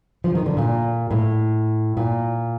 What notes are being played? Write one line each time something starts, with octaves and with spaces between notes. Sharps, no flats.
F3
D#3
D3
A#2
A2
A#2